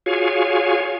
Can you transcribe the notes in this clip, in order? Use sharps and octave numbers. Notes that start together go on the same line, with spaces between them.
F4 F#4 G#4 C#5 F5 G#5